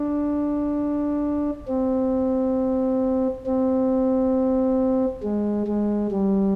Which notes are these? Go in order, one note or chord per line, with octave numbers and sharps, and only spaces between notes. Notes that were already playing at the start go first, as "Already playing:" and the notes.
Already playing: D4
C4
C4
G#3
G#3
G3